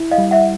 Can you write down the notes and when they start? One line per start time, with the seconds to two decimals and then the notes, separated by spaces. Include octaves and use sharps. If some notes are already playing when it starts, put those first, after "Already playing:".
Already playing: E4
0.11 D#5 F5
0.18 G3
0.31 E5 F#5